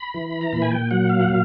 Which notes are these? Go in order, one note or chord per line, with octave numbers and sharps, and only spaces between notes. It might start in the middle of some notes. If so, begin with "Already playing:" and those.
Already playing: B5
E3
A#5
A#2 B5
G#5
G5
F#3 F#5
F5
F#5
A#2 F5